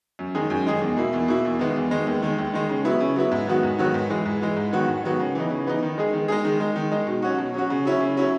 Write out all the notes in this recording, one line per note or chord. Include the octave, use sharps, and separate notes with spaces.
F#2
D#3 G#3 D#4 G#4
F#2
D#3 G#3 D#4 G#4
E2
B2 A#3 E4
E2
B2 A#3 E4
E2
D#3 G#3 B3
E2
D#3 G#3 B3
D#2
D#3 G#3
D#2
D#3 G#3
C#3
F#3 B3 E4
C#3
F#3 B3 E4
G#2
D#3 F#3 B3 F#4
G#2
D#3 F#3 B3 F#4
G#2
E3 G#3
G#2
E3 G#3
G#2
D#3 F#3 B3 F#4
G#2
D#3 F#3 B3 F#4
C#3
E3 B3 D#4
C#3
E3 B3 D#4
D#3
G#3 D#4 G#4
D#3
G#3 D#4 G#4
D#3
G#3 D#4
D#3
G#3 D#4
B2
F#3 C#4 F#4
B2
F#3 C#4 F#4
C#3
F#3 C#4 E4
C#3
F#3 C#4 E4